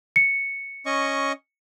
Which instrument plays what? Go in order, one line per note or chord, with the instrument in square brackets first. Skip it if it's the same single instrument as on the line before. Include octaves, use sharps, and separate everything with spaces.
[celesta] C#7
[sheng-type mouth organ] C#4 D#5 C#6